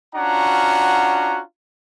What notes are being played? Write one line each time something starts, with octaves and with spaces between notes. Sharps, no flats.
C#4 D4 F4 F#4 F#5 A#5